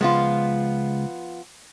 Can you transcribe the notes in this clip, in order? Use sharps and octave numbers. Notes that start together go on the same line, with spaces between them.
C#2 F3 G#3 B3 F4